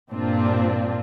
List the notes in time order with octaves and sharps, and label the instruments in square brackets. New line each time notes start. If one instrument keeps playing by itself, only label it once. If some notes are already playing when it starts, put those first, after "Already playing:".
[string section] G2 A#2 C4 D4 F4